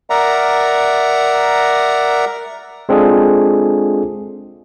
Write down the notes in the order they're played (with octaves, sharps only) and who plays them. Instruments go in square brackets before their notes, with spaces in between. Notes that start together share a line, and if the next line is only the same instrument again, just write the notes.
[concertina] A#4 D5 E5 F#5 A#5
[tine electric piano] G#3 C4 D4 F4 G#4 A4